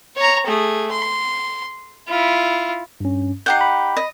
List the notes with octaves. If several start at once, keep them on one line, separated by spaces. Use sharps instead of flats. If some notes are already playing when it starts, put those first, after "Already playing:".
C#5 A#5
A3 G#4
C6
E4 F4
G2 C#4
D#4 G4 F#5 G6 C7
B5
D#5